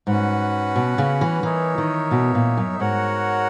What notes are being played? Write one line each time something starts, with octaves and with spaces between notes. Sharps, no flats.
G#2 C#4 F#4 B4 F#5
B2
C#3
E3
E3 D#4 A#4 C#5 E5
D#3
B2
A#2
F#2
G#2 F#4 A#4 C#5 F#5